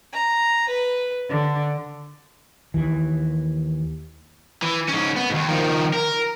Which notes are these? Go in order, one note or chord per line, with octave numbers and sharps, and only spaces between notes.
A#5
B4
D3
D#2 E3
E3
G#2 C#4
B3
D#2 G#2
D#3 F3
A#4